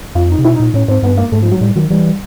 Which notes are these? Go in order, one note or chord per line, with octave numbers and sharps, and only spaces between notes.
F2 F4
D#4
C3
B2 E4
D#4
A#2
A2 C#4
G#2 C4
G2 B3
A#3
G#2 A3
F3
F#3
A2 G3
D#3 F#3
E3 G3